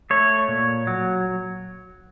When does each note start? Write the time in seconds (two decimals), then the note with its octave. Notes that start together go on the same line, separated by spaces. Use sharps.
0.10 A3 C#5
0.48 A#2
0.87 F#3